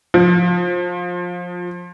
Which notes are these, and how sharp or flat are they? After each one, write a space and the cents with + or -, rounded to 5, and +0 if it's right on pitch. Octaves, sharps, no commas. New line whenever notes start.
F3 +20